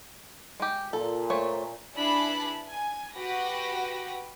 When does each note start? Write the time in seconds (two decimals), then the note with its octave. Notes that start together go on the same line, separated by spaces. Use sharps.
0.60 G#3 G4
0.93 A#2 A4
1.30 A3 C4 C#5
1.95 D4 E4 G#4 B4 A5 B5
2.68 G#5
3.14 F#4 G4 B4 A#6